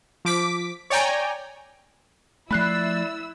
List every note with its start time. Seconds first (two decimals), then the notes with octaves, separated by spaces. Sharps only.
0.25 F3 D6 B6
0.90 C#5 D5 G5 G#5 A#5
2.51 F3 A3 E4 D5 B5 E6 F#6 C7